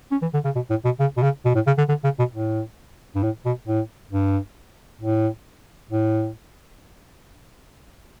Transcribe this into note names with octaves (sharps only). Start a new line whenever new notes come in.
C#4
E3
D3
C#3
B2
A2
B2
C#3
B2
C#3
B2
A2
C#3
D3
D3
C#3
B2
A2
G2
A2
B2
A2
G2
A2
A2